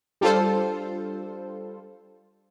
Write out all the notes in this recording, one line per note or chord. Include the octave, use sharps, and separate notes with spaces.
G3 D4 F4 A4 C5